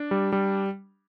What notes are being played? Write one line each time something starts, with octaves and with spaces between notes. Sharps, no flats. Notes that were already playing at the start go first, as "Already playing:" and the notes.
Already playing: D4
G3
G3